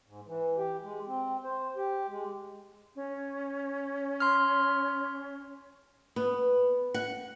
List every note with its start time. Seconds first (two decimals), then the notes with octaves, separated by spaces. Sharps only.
0.06 G#2
0.26 E3
0.57 G4
0.83 G#3
1.07 C4
1.44 C5
1.76 G4
2.08 G#3
2.96 C#4
4.20 C6 F6
6.16 B3
6.94 F#5